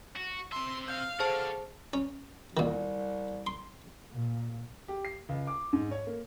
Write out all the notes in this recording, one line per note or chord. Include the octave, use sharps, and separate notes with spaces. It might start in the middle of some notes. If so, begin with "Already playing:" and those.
F#4
C4 E5 C6
F5 G6
G#4 A4 C5 F#5 A5
C#4
C2 A#2 D#3
C6
A#2
G4
C7
C#2
D6
G#2
C#5
A#3